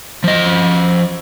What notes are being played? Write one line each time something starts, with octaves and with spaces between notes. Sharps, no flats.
F3 D#5